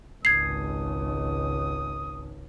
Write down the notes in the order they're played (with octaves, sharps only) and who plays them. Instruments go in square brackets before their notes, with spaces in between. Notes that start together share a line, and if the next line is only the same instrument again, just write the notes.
[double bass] G#1 C#2 [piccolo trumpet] D#6 [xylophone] G#6 C7